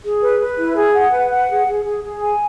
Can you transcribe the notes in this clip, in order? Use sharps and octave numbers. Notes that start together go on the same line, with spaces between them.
G#4
B4
B4
E4
G#4
F#5
B4
F#5
G#4
G#4
G#4
G#4
G#5